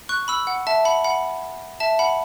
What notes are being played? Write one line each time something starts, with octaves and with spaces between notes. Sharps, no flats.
C#6 F#6
B5 E6
F#5
E5 A5
F#5 B5
F#5 B5
E5 A5
F#5 B5